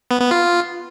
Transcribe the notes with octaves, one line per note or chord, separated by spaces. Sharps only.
B3
B3
F4